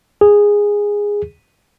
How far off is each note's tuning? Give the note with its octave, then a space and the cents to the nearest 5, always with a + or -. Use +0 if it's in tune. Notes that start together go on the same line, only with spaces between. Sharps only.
G#4 -10